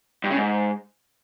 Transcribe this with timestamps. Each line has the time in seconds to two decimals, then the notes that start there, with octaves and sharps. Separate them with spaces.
0.24 G2
0.30 C#3
0.36 G#2